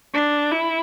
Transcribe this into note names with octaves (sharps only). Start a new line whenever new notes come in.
D4
E4